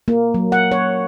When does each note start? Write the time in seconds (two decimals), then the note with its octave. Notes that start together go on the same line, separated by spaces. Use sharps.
0.08 A#3
0.34 F#3
0.52 F#5
0.72 C#5